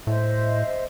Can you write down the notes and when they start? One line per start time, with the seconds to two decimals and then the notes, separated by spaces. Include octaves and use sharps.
0.07 A2 C5 D#5 E5